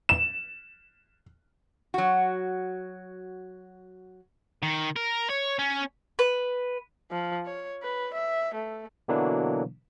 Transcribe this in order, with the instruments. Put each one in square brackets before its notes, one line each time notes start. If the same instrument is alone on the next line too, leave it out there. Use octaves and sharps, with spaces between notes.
[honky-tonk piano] E7
[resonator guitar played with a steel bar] F#3 F#4
[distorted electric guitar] D#3
A#4
C#5
C#4
[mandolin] B4
[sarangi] F3
C#5
B4
E5
A3
[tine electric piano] B2 D3 E3 F#3 A#3 D4